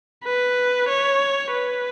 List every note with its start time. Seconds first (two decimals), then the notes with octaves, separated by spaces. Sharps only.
0.24 B4
0.88 C#5
1.52 B4